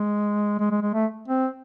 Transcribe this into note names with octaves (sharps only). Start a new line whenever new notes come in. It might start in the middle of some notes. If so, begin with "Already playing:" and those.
Already playing: G#3
G#3
G#3
G#3
A3
C4